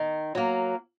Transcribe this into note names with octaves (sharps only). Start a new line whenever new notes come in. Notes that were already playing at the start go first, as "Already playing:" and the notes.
Already playing: D#3
F#3 A#3